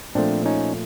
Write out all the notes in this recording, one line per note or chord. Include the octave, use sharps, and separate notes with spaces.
A#2 F3 A3 C4 D4
C#4 D#4